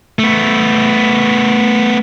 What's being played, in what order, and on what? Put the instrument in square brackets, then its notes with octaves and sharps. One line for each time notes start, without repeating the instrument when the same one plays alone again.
[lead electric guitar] A3 B3